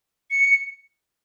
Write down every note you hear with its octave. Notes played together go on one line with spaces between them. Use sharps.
C#7